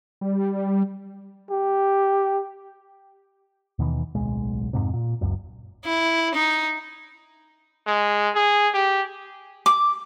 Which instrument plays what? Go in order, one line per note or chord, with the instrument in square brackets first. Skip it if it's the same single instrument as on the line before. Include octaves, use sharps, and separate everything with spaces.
[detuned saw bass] G3
[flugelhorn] G4
[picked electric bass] D#2 B2 D#3 E3
D1 B1 G#3
F2 G#2 C3
A#2
F#1 C#2 F#2
[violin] E4
D#4
[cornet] G#3
G#4
G4
[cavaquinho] D6